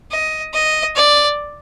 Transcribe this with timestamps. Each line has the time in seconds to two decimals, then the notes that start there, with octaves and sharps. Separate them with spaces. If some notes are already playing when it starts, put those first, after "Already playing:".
0.12 D#5
0.54 D#5
0.96 D5